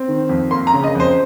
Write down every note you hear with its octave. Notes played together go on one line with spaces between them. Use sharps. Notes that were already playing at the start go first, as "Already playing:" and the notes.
Already playing: C4
D#3
F2
A#3 C6
A#5
C#3
D#5
F2 C5